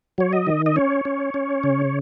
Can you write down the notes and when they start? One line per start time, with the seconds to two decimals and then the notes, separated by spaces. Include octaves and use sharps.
0.18 F#3 C#5
0.33 D#5
0.47 D#3
0.66 D#5
0.76 C#4 C#5
1.05 C#4
1.34 C#4
1.63 C#3